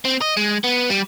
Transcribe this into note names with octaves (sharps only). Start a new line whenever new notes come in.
C4
D#5
G#3
B3
G3